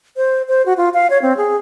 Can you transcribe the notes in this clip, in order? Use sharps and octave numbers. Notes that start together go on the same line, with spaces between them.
C5
C5
F#4
F4
F5
C#5
C4
G#4